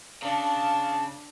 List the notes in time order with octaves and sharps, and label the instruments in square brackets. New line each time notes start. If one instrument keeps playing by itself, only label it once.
[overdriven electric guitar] C#3 [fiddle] D4 [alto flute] F5 [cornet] A5